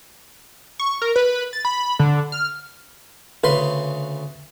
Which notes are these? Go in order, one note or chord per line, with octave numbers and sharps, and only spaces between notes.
C#6
A#4
B4
A6
B5
D3
F6
D2 C#3 B4 C6